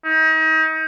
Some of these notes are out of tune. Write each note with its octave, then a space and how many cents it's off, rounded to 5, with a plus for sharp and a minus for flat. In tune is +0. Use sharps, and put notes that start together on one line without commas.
D#4 +35